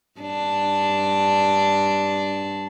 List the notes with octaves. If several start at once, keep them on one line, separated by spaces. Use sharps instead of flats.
G2 D4